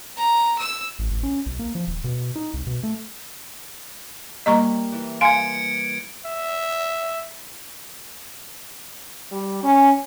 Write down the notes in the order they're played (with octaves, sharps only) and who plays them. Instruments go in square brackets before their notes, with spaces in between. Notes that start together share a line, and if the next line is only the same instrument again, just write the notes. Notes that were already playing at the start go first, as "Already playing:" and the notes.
[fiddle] A#5
E6
[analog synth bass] A1
A1
C#4
B1
A#3
F3
D#1
B2
D#4
C2
B2
A3
[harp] G3 A#3 [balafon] D#5 A#5 C#6
[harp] E3
[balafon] F5 G#5 C6 [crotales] G#6 C#7 D7
[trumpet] E5
[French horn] G3
C#4